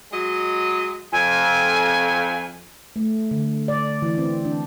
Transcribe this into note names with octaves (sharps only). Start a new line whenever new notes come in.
F#3 G#3 D#5
F2 G#5
A3
D3
D5
E3
C4
D4